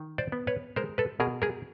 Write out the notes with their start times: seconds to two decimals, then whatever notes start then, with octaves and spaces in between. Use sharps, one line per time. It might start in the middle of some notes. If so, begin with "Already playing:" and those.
Already playing: D#3
0.18 C5 D5
0.32 B3
0.47 B4 C#5
0.76 G#3 A#4 C5
0.98 A4 B4
1.20 B2 G#4 A#4
1.42 G#4 A#4